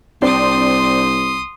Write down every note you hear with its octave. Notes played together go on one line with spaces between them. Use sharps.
C2 C4 D4 C6 D#6